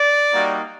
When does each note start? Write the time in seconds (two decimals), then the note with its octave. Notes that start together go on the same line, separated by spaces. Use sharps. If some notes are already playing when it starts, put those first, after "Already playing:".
Already playing: D5
0.34 G3 A#3 D#4 F#4